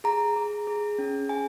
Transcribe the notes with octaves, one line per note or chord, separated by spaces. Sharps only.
G#4 A#5
G#4
G#4
C#4
G#4 G#5